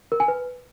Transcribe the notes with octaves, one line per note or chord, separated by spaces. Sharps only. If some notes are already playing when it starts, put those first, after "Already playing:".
A#4
G#5
B4